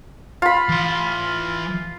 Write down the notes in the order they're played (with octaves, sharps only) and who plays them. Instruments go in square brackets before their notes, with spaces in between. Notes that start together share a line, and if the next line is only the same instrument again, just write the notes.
[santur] F4 B5
[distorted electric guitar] E3 C6